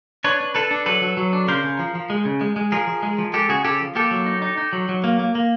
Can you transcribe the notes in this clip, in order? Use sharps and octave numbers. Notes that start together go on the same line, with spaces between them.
D4 B4 C#5
D4
D4 A4 B4
D4
F#3 A4 B4
F#3
F#3
D4
C#3 A#4 C5
C#3
F3
F3
G#3
C#3
G#3
G#3
F3 G#4 A#4
F3
G#3
F3
G#3 G4 A4
C#3 F#4 G#4
C#3 G4 A4
F3
A#3 G4 A4
F#3
D#4
D#4
D#4
F#3
F#3
A#3
A#3
A#3